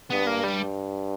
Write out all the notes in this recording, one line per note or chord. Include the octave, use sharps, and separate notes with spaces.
G2 B3
A#3
G3